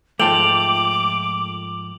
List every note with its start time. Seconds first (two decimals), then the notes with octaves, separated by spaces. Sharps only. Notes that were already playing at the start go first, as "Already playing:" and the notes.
0.20 G#2 F3 A3 G5 A5 D6 F7 F#7